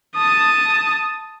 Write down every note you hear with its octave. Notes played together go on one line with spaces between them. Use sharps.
A5 D#6